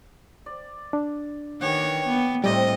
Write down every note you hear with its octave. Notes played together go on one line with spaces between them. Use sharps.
D5
D4
D#3 E3 G4 C#5 F#5
B3
A2 C3 G3 A3 C4 G4 D#5